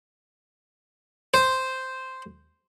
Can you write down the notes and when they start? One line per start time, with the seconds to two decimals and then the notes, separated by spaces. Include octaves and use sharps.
1.34 C5